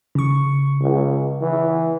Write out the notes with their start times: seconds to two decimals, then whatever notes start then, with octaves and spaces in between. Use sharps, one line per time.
0.15 C#3 C#6
0.82 C#2
1.41 E3